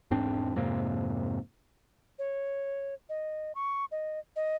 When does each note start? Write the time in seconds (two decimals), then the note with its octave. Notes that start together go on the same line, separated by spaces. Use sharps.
0.11 E1 G#2 C4 D4
0.56 F2 G#2 C3 A#3
2.19 C#5
3.09 D#5
3.55 C#6
3.91 D#5
4.36 D#5